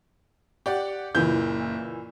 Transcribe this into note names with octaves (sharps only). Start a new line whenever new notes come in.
G4 D5 F#5
F#1 A#2 E3 G6